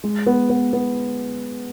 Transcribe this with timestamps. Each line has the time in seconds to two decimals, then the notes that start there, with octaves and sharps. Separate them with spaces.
0.04 G#3
0.26 B3
0.50 B3
0.73 B3